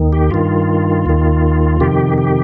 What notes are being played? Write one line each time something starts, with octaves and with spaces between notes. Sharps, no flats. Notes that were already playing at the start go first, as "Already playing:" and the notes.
Already playing: D#2 D#3
G4
G2 D#3 F4
D#2 D#3
F2 C3 D#3 G4
G4